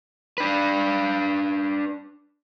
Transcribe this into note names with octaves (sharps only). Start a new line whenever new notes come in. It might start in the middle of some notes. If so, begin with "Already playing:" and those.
D4 B4